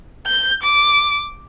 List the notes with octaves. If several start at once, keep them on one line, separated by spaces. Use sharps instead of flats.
G6
D6